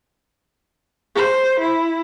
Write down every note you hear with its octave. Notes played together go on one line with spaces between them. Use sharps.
C5
E4